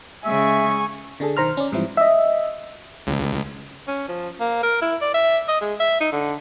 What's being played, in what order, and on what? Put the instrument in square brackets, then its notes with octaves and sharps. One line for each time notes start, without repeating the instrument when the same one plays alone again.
[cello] C#3 G#3 [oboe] E5 [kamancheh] G#5 C#6
[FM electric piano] D3 D4 G#4 A4
B1 D#3 C5 A#5 C6 F6
C#4 D5
G#2 E3 F3 G3 C4 E4
D#5 E5
[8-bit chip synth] C#2
[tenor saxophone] C#4
F3
A#3
A#4
E4
D5
E5
D#5
G#3
E5
D#4
D3